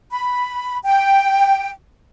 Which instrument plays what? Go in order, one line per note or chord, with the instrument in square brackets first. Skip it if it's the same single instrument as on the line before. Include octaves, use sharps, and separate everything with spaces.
[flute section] B5
G5